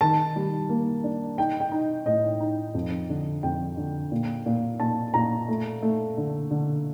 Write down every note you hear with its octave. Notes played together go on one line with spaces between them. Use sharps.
D#3 A5
G3
A#3
D4
D#4 G5
G5
D#4
A2 D#5
D#4
F2
D3
F2 G5
D3
A#2
A#2
A#2 A5
A#2 A#5
A3
A3
D3
D3